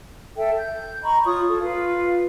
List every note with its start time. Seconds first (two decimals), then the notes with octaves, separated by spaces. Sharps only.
0.36 A4 E5 G5
0.56 G6
1.02 D#5 A#5 B5 C#6
1.25 F4 C#5 C#6 D#6
1.48 F4 A4
1.61 F4 B4 F5